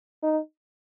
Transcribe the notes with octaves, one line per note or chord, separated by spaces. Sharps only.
D#4